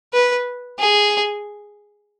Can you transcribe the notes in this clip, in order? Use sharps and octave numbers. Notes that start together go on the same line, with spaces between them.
B4
G#4